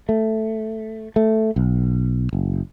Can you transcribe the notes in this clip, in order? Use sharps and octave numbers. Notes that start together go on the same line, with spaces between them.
A3
A3
B1
F#1